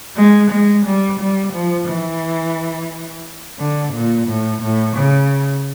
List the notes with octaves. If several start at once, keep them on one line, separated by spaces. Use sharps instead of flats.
G#3
G#3
G3
G3
F3
E3
D3
A#2
A2
A2
C#3